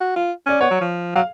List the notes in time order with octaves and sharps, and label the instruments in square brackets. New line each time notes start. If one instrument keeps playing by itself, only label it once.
[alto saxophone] F#4
F4
[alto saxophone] C#4 [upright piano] D5
[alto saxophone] B3 [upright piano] C#5
[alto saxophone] F#3
F3
[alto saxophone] F#3 [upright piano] F5